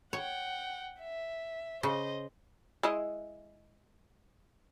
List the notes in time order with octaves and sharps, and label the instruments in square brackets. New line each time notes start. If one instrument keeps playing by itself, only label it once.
[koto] C#5 [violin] F#5 G5
[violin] E5
[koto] C#3 [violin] C5 D#5
[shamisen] G#3 E4 D#5